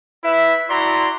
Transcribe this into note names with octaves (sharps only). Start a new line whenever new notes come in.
E4 B4 E5
E4 F#4 D5 A#5 C6